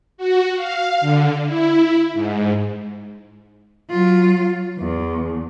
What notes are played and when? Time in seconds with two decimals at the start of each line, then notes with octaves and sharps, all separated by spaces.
0.18 F#4
0.55 F5
1.01 D3
1.45 E4
2.14 G#2
3.90 F#3 F4
4.79 E2